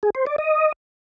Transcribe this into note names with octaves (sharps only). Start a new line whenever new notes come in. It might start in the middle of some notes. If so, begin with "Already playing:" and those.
G#4
C5
D5
D#5